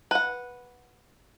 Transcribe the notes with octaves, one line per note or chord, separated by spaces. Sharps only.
B4 F#5